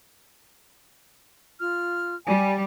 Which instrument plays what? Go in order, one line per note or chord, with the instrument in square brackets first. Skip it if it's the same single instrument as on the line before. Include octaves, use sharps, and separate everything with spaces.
[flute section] F4 F6
[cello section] G3 [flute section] D5 G#5